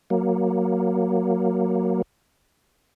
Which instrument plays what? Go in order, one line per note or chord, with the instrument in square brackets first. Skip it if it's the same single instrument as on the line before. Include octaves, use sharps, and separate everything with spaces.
[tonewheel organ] F#3 A#3